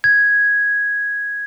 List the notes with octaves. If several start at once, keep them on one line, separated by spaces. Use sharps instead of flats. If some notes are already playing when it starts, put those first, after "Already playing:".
G#6